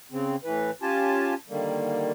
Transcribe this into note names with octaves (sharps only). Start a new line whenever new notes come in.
C#3 C4
A2 E3 B4
C#4 F4 G4 G#5 A5
D3 D#3 G3 A#3